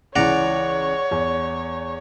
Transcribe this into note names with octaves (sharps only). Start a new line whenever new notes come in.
C#2 E3 C#5 D5 F#5 A#5
E2